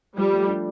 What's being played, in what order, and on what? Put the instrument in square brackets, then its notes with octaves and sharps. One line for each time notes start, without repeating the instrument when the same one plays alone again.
[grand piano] F3 [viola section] G3
[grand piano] A3
D4